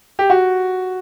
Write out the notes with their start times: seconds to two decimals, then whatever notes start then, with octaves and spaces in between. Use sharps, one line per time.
0.19 G4
0.30 F#4